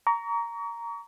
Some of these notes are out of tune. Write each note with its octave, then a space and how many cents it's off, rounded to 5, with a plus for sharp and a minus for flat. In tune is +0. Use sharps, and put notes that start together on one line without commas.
A#5 +0 C#6 +40